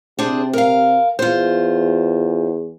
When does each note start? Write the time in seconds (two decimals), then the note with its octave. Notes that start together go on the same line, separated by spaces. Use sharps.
0.19 C3 D4 G#4 C5
0.53 A#4 F5
1.19 E2 F4 C5